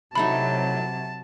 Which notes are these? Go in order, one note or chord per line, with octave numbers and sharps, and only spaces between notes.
A2 C3 F#3 A3 D#4 A5 B5